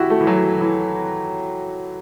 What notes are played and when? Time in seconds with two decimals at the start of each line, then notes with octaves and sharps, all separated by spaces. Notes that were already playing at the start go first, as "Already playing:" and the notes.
Already playing: E4 F#4 G4
0.10 A3
0.21 E3
0.27 F#3
0.61 E3